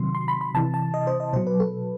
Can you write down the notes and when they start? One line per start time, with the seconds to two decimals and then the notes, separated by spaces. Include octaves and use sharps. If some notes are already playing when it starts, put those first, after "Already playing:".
Already playing: C3 D#3 F#3 C6
0.15 C6
0.28 B5
0.41 B5
0.54 C3 E3 A5
0.74 A5
0.94 D#5
1.07 C5
1.20 D#5
1.33 B2 F#3 C5
1.47 B4
1.60 A4